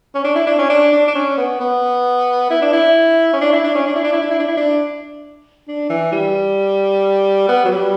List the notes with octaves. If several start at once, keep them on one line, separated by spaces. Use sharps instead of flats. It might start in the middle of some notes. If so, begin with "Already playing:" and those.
C#4
D4
E4
D4
C#4
D4
D4
D4
C#4
B3
B3
E4
D4
E4
C#4
D4
E4
D4
C#4
D4
E4
D4
E4
D4
E4
D4
E4
D4
D4
E3
G3
B3
F#3
G3